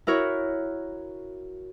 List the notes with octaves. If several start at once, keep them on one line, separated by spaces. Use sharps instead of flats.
E4 F#4 A#4 C#5